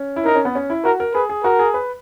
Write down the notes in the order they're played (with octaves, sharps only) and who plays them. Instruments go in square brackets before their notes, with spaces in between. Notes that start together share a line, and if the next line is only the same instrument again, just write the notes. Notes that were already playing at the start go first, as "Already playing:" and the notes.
Already playing: [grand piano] C#4
E4
[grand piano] D#4 [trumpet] A#4
[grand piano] C#4
B3
C#4
E4
[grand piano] F#4 [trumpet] A#4
[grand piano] A#4
[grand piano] G#4 [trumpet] B4
[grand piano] G#4
[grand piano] F#4 [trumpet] A#4
[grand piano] G#4
B4